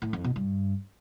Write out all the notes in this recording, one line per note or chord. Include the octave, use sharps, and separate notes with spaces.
A2
F2
B2
G2